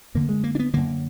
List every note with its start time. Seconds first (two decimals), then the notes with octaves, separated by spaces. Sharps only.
0.15 F#2 D3 A#3
0.29 G#3
0.44 A#3
0.55 D4
0.59 B3
0.73 F#2 D3 A#3